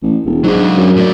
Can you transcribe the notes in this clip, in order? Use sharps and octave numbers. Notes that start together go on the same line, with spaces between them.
A1
E1
G#2 F#3 D4
F#2
A2 D5